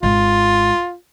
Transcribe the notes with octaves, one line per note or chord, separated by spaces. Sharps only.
G#1 G#2 F4